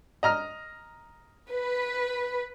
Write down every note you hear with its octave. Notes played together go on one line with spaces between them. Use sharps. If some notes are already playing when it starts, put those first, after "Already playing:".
D#5 A#5 F6
B4